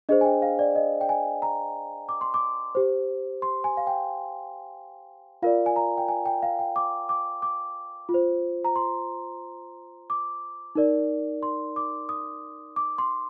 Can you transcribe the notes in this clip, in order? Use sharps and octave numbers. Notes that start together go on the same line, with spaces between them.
D4 G#4 C5 D#5
G#5
G5
F5
D5
D#5
G5
G#5
A#5
D6
C6
D6
G4 C5
C6
G#5
F5
G5
F4 A#4 D5 F5
G#5
A#5
G5
G#5
G5
F5
G5
D6
D6
D6
F4
C5
A#5
C6
D6
D#4 A#4 D5
C6
D6
D#6
D6
C6